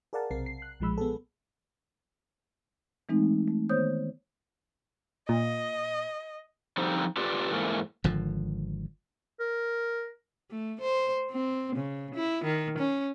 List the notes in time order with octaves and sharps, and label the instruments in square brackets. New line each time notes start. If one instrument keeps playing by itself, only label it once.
[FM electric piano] G#4 A#4 D5 F5 F#5 A5
B1 C3 C4 A#4 C7
C7
F#6
B1 A#2 F3 G#3 B5 E6
B3 G#4 A4
[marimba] E3 G#3 A3 C4 D#4
A3
D#3 B3 C5 C#5 D#6 G6
[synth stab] A#2 [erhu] D#5
[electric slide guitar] D3 F3 G3 C4 D#4
D4 F4 G4 A4 B4 D5
G#2 E3 A3 A#3
[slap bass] G#1 D3 F3
[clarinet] A#4
[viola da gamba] A3
C5
C4
C#3
E4
D#3
C#4